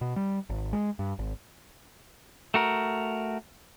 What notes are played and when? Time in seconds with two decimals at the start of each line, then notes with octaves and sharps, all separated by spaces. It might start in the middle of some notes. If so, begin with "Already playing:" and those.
0.01 B2
0.16 G3
0.50 G#1
0.73 G#3
0.99 G2
1.19 G#1
2.54 A3 F#4 A#4